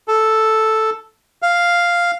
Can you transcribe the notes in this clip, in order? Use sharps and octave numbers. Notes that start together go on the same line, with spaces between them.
A4
F5